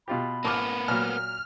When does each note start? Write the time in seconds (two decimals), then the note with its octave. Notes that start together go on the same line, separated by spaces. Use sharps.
0.08 B2 F4 G4 B5
0.44 A1 A#3 B3 D6 F6
0.88 A#2 F#3 F6